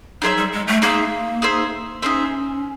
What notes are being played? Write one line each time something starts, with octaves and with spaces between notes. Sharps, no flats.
F#3 D#4 G#4 C5 E5
G3
G#3
A3
A#3 D#4 G#4 C5 E5
D#4 G#4 C5 E5
C#4 D#4 G#4 C5 E5